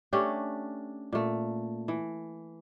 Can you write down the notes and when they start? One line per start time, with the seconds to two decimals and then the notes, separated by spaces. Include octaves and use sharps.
0.13 A3 C#4 D4 G4
1.13 A#2 A3
1.88 E3